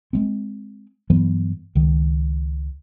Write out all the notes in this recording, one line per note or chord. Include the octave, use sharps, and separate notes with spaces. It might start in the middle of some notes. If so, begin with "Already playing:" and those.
G#3 A3 C4
G2 E3 F#3 B3
C#2 D#3